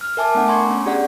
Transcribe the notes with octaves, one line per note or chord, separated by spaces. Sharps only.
F6
A#4 E5 G#5 A5 D6
A3 B3 D4 F#5 D6
G#5 A#5 C6 C#6 G#6
B3 C#4
D4 G4 G#4 D5 F#5 G#6